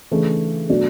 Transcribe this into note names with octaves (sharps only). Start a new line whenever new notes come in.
C#3 E3 A3 D4 G#4
B2 F#3 A3 D4